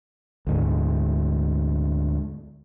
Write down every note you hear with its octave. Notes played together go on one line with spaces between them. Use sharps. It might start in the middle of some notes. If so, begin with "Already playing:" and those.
D2 G#2